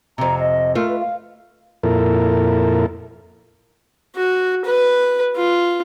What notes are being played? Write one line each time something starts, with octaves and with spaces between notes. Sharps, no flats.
F2 C3 A#5
D#5
A3 F4 A#4
B4
F5
F2 A#2 E4 A4 A#4
F#4
B4
F4